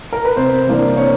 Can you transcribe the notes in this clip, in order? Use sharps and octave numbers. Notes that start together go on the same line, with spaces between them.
A#4
B4
C3 C5
E3 G3 A#3 D4
C3 C#5